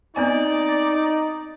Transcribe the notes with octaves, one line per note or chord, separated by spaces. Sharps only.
B3 C4 D#4 D5 G#5